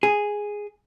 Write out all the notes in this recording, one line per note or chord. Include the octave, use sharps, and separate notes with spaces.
G#4